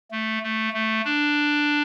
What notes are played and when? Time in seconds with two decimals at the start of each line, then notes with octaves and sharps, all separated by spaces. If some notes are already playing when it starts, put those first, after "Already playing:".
0.11 A3
0.42 A3
0.73 A3
1.05 D4